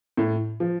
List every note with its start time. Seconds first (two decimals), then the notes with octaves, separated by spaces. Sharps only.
0.17 A2
0.60 F3